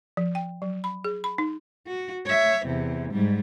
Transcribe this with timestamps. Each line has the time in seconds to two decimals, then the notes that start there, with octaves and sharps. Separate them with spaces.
0.17 F3
0.35 G5
0.62 F#3
0.84 B5
1.04 G#4
1.24 B5
1.38 D#4
1.87 F#4
2.26 C#5 E5
2.66 E2 C3
3.11 G#2 G3